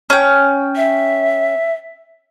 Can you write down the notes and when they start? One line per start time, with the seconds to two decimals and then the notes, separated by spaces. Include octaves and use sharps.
0.10 C#4 G5
0.76 E5